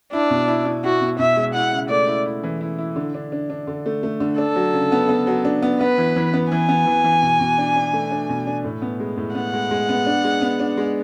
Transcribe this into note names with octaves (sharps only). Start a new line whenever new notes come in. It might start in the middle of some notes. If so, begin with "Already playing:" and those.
D4 E4
B2
E4
E4
E4 F#4
B2
B2 E5
G#3
E4 F#5
C#3
A3 D5
E4
E4
E3
E4
E4
D3
D4
D4
D4
D3
A3
A3
D3
D4 A4
F#3
C#3
B3
B3
F#3
D4
B3
B3 B4
E3
E3
B3
E3 G#5
B3
E3
E3
B2
B2
D4
D4
A3
D4
B2
D4
A2
B3
G#3
A2
B3 F#5
G#3
G#3
B3
D4
G#3
B3
D4
G#3